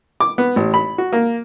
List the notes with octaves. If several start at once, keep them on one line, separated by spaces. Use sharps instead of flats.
D6
B3
A1
B5
F#4
A#3